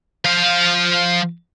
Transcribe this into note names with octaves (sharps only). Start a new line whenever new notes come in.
F3 F5